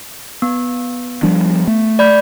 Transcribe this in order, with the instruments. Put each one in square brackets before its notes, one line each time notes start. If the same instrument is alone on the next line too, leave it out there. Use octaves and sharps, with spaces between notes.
[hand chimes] B3
[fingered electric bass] F3 G3 D4
A3
[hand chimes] D5 B5 G6